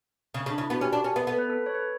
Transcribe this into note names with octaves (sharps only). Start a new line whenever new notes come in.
C#3
C#4
C#3
D4
C#3
E4
B3 F#4
C#4 G4
D4
C#4
B3
B3 A4
B4
A4
C#5
B4